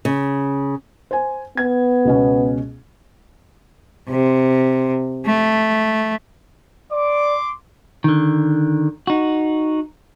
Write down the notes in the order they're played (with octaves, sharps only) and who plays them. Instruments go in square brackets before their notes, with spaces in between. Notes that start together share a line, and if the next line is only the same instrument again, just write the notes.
[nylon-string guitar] C#3
[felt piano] C5 G#5
[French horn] B3 [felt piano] G#6
[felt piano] C#2 B2 C#4
[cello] C3
A3
[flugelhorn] D5 [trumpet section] C6 D6
[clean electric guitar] D3 D#3
D#4 F#4